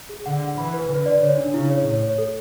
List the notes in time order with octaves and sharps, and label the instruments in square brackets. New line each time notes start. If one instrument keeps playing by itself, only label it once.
[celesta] G#4
[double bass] D3 [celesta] F#5
[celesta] F#5
[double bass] E3 [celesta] B5
[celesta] B4
[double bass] D3 [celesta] B4
[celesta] D5
[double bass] D3 [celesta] C#5
[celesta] D4
[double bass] C#3 [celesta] E4
[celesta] C#5
[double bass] A2 [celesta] C#5
[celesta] C#5
A4